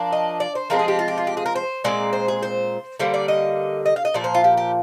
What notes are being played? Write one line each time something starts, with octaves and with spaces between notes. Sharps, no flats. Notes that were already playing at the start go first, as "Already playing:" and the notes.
Already playing: F3 A#3 D4
D#5
D5
C5
F3 G#3 C4 A#4
G#4
G4
F4
G4
F4
G4
G#4
A#4
C5
A#2 G#3 C4 D5
C5
G#4
C5
D3 G3 A#3 C5
D5
D#5
D#5
F5
D#5
A#2 F3 D5
C5
F4
G4
G4